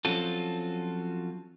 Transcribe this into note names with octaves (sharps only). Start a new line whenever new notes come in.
F3 F#3 C4 C#4 F4 A4